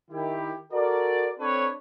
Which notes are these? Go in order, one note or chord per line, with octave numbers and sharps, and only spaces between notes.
D#3 E4 G4
F#4 A4 A#4 D5
C4 D4 A4 B4 C#5